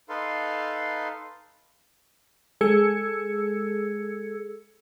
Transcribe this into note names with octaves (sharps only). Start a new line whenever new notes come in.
D#4 A4 B4 F5 C6
G#3 G#4 A4 E6 G#6 C#7